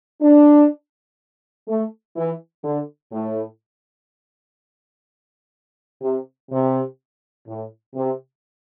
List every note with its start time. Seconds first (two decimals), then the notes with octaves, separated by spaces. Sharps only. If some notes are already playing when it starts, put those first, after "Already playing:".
0.22 D4
1.68 A3
2.16 E3
2.64 D3
3.12 A2
6.02 C3
6.51 C3
7.48 A2
7.95 C3